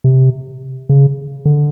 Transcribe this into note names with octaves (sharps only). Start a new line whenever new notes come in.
C3
C#3
D3